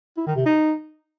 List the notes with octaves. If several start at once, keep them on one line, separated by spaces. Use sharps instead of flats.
E4
D#3
C3
D#4